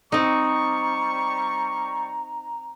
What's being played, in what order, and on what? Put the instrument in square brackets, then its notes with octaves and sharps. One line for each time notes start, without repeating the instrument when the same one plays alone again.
[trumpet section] G3 C#6 [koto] C4 D#4 [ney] A#5